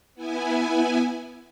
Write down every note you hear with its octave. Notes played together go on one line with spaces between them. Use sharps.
B3 E4 G#5